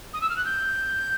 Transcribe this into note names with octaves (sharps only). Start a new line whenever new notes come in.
D#6
E6
F6
F#6
G6